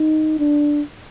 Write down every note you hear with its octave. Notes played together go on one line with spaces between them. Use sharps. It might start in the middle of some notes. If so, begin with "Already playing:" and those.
Already playing: D#4
D4